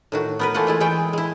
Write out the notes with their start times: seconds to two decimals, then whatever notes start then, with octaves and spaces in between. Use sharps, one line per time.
0.12 A2 D#3 F#4
0.39 B3 A#4 B4
0.54 E3 A3 A#3 F4 F#5
0.67 G#3 E4 F4
0.80 E3 G#3 C#5 G5
1.13 G#3 E4